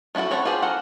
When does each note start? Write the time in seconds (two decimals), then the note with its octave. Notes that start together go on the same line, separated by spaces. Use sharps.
0.15 A3 D4 E4 F#4 A4
0.31 C4 C#5 F#5 A5 B5
0.45 F4 G4 G#4 C5
0.62 A4 A#4 F#5